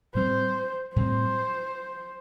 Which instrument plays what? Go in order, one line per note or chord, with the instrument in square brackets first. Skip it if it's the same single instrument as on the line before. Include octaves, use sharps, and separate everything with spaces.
[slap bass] A2 G3 C4 [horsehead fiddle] C5
[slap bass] A2 G3 C4 [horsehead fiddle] C5